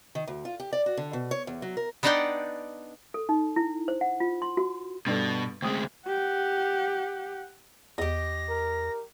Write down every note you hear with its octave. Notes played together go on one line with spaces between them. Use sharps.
D#3
D2
F4
G4
D5
F#4
D3
B2
C#5
E2
F#3
A#4
B3 D4 D#4 D5 F#5 G5
A4
D#4
E4
C5
F#5
F4
C6
F#4
G2 B2 D4 A4
D2 G#3 C4 D#6
G4 F#5
E2 G4 D#5 A#6
A#4